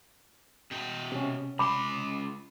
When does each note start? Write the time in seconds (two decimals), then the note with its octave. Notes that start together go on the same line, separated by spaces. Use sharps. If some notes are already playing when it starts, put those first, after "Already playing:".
0.71 B2 G5
1.12 C3 C#4
1.59 C#2 B5 C6 D6